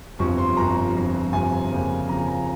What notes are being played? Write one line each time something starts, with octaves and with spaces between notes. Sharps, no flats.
G1 F2 C3 F3 C#6
C6
G1 F2 C3 F3 A#5
G1 F2 C3 F3
G1 F2 C3 F3 G#5
F2 C#3 F3 A#3
F2 C#3 F3 A#3 A#5
A#5